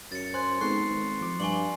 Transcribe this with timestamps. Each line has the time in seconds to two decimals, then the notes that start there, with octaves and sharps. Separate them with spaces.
0.12 F#2 A6 C#7
0.34 C5 G#5 C6 F#6 G#6
0.61 G#2 B3 C4 A4 C#6 F#6 C7
0.89 G#1
1.21 F3 D6
1.40 G2 G#5 C#6 F#7